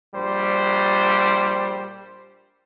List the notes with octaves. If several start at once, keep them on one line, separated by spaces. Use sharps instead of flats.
A#1 G3 C5